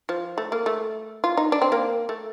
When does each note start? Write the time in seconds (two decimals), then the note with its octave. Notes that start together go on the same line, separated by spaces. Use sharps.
0.09 F3
0.38 A3
0.52 A#3
0.66 A3
1.24 F4
1.37 D#4
1.52 D4
1.62 C4
1.72 A#3
2.09 A3